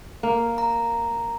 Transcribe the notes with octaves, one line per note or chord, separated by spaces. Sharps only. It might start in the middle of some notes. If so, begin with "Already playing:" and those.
A#3
A#5